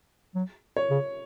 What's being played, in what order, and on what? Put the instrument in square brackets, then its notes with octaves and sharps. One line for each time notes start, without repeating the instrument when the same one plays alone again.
[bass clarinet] F#3
[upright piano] C#5
[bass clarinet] C#3